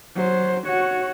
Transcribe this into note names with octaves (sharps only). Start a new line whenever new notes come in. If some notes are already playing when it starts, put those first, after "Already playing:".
F#3 C5
F#4 C#5